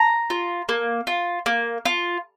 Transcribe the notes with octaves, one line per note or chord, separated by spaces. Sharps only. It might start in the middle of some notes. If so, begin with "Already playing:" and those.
Already playing: A#5
F4
A#3
F4
A#3
F4